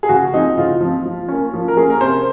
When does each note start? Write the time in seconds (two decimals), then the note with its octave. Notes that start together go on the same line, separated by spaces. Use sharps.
0.03 G#4
0.09 C#3 F#4
0.33 F3 C4 D#4
0.57 C#3 F4
0.81 F3 C4
1.05 F3
1.28 A#3 C#4
1.53 F3
1.68 A#4
1.76 A#3 C#4 G#4
1.90 A#4
2.01 C3 C5